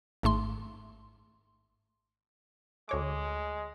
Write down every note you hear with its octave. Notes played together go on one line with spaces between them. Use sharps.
G#1 G#2 A3 C6
D2 G#3 C#5 D6